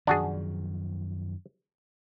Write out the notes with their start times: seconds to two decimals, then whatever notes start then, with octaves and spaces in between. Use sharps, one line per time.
0.07 F#2 D#3 F3 D4 F#4 G#4